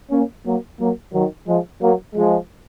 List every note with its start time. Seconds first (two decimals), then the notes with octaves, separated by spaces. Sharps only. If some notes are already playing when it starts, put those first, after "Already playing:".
0.11 A#3 C#4
0.45 F#3 A#3
0.79 F#3 A#3
1.13 D#3 F#3
1.47 F3 G#3
1.81 F#3 A#3
2.15 F3 G#3